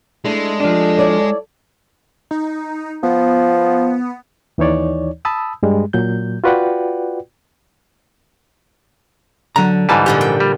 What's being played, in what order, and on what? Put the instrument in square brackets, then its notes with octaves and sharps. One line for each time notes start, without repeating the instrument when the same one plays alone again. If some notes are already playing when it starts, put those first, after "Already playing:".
[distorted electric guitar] G#3 [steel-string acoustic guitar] A3 D4 E4
[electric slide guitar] F3 D4 [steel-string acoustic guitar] G4 [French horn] A4
[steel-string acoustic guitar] E4 C#5 D5
[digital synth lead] D#4
[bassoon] F3 [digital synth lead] B3
[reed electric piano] D#2 E3 D#4 C#5 D5
A5 B5 D#6 E6
G2 G3 G#3
A#2 F#3 G6
F4 F#4 B4 D5 F#5 G5
[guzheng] D3 [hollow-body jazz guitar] F#3 A#5
[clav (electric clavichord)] G#2 E3 G3 [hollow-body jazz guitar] G#5 A5
[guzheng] A#2 D3 F3 [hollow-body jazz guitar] G4
[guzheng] G5
[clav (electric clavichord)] G3